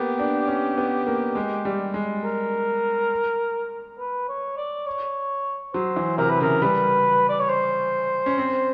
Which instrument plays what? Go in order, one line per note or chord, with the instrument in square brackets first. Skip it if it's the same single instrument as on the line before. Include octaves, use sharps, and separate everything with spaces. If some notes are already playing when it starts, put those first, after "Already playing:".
Already playing: [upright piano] A#3 B3 [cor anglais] G4
[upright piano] D4
C#4
B3
A#3
G#3
G3
G#3
[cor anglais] A#4
B4
C#5
D5
C#5
[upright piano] F#3 [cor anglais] C5
[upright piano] E3
[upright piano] C3 [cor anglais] A#4
[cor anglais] B4
[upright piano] C#3 [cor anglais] A#4
[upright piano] G3 [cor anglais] B4
[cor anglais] D5
C#5
C5
[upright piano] C#4
C4